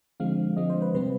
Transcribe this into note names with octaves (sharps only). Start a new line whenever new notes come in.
D3 F3 G#3 C4 F5
D3 F3 G#3 C4 D#5
C5
B4
C3 G3 C4 B4